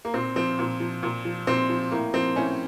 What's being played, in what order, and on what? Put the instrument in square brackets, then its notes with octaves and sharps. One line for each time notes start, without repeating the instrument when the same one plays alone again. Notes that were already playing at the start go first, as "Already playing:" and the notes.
[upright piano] A#3
A#2 C4
F3 C4
A#2
F3
A#2
F3
A#2 C4
F3
A2 A#3
F3 C4
A2 C#4